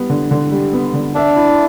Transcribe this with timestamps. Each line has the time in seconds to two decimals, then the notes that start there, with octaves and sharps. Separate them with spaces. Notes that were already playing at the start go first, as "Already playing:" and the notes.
Already playing: G3 B3
0.10 D3
0.31 D3
0.51 G3
0.73 B3
0.94 D3
1.15 D4 E5
1.36 E4